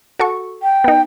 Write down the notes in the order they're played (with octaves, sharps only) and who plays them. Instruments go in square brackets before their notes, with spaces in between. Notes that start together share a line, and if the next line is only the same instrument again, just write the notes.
[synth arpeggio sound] F#4 A4 C#6
[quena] G5
[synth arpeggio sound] B3 D#4